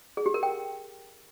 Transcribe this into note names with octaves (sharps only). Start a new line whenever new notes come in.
G#4
G4
A#4
G5